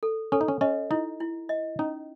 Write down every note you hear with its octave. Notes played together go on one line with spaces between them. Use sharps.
A4
C#4 A4
D#4
C#4
C#4 D#5
D#4 E4
E4
D#5
C#4 D#4